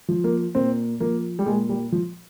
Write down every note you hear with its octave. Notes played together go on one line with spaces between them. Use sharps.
F3
A#3
A#2 C4
F3 A#3
G3
A#2 G#3
G3
F3